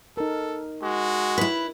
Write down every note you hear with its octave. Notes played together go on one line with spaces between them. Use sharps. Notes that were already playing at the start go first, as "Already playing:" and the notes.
D#4 A4 A#4
G#3 F#4
E4 B4